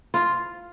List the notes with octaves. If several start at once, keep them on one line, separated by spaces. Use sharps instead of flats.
F4